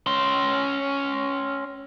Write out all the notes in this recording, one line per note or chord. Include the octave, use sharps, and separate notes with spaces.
C#4 C6